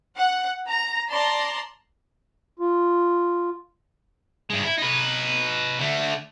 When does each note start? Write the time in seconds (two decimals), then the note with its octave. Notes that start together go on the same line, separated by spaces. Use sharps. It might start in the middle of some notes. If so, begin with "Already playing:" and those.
0.16 F#5
0.67 A#5
1.11 D5 A5 A#5 C6
2.59 F4
4.50 G2 G#3
4.64 E4
4.78 D#4 B4
5.79 D3 A3